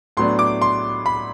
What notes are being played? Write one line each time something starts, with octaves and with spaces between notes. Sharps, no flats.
A2 F#3 B3 D4 C6
D6
C6
B5